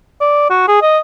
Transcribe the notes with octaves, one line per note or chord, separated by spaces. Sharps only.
D5
F#4
G#4
D#5